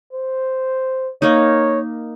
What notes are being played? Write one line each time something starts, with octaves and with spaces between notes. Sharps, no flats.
C5
A#3 D#4 C#5